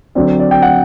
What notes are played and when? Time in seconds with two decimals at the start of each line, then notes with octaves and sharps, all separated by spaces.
0.15 D3 F#3 C4 D5
0.27 C5
0.39 D5
0.51 G5
0.62 F#5